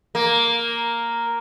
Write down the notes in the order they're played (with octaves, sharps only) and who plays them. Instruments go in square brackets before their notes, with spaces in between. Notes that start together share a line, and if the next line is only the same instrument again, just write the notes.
[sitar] A#3